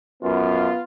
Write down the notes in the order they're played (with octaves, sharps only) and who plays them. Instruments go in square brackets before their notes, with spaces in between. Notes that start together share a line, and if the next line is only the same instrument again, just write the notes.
[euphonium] F#2 [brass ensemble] B3 F4